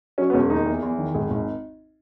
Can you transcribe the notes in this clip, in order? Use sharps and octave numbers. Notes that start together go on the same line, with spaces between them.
F#3 C#4
B3
E1 C#4
D#2 D#4
E2
E2
D#3
G#1 G#4
G#1